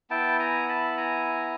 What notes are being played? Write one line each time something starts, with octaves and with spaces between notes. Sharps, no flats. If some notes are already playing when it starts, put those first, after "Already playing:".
B3 E4 G5 A5
G#5 A#5
A5 B5
G#5 A#5